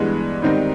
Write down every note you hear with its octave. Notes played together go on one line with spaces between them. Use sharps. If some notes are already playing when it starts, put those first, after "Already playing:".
Already playing: G2 E3 G#3 B3
G#2 D#3 G3 C4 D#4